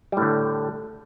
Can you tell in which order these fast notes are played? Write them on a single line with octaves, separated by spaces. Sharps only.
G3 A2 D3